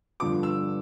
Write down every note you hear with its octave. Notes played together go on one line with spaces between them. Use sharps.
G2 D3 F3 B3 D6
E6